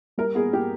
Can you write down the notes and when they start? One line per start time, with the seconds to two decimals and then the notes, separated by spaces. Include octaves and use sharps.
0.18 G3 A#4
0.35 B3 G#4
0.53 G4